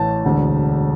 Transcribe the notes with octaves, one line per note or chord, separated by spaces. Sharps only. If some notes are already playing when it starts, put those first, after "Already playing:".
Already playing: A1 A2 E3 A5
E1 D2 D3